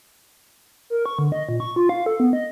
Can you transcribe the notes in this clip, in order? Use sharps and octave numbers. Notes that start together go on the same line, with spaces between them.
A#4
C#6
D3
D#5
A#2
C#6
F4
F5
A4
B3
D#5